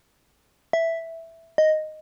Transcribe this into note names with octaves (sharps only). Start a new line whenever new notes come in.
E5
D#5